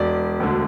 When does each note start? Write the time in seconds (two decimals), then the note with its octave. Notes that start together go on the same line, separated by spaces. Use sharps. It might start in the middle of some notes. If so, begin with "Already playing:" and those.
Already playing: E1 D5
0.40 D2 D3